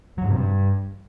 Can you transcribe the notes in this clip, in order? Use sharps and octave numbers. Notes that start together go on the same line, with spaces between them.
F#3
G#2
C3
G2